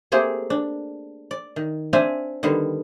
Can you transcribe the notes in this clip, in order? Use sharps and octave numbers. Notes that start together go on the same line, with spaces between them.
A3 A#3 C4 G4 G#4
D4
D5
D#3
C4 D4 E5 F5 G#5
D3 D#3 G3 B3